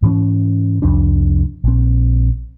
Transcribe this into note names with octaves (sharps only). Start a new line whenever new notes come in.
G#2 E3 C#4
C2 F2 D4
A#1 C4